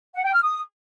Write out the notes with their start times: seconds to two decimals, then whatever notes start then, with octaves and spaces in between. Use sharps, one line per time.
0.14 F#5
0.23 G5
0.33 F6
0.42 D#6